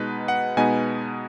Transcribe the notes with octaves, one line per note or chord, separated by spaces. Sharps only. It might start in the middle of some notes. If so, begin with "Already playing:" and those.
Already playing: B2 G#3 B3 D#4 B4
F#5
B2 G#3 B3 D#4 G#5